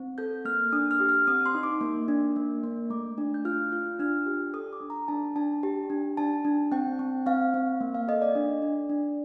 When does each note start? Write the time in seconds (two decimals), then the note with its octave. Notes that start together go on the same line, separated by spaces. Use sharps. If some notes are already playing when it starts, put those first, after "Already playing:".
Already playing: C4
0.18 A4 G6
0.45 A#3 F6
0.73 D4 D#6
0.91 F6
1.00 G4
1.09 F6
1.28 C4 D#6
1.46 C6
1.55 D#4
1.63 D6
1.81 A#3
2.08 D4
2.36 A#3
2.64 A#3
2.90 A3 D6
3.18 D4
3.34 G6
3.45 F4 F6
3.72 F4
3.99 D4 F6
4.26 G4
4.54 A4 D#6
4.73 D6
4.81 D4
4.90 A#5
5.08 D4 A5
5.36 D4 A5
5.63 G4
5.90 D4
6.17 D4 A5
6.45 D4
6.72 C4 G5
6.99 C4
7.26 C4 F5
7.54 C4
7.81 A#3
7.95 F5
8.08 A4 D#5
8.22 D5
8.35 D4
8.62 D4
8.89 D4